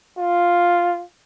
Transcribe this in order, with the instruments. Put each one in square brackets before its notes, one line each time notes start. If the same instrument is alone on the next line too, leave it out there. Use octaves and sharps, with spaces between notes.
[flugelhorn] F4